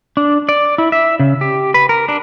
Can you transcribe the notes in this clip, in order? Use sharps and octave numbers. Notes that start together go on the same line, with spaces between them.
D4
D5
E4
E5
C#3
G4
B4
A#4
D4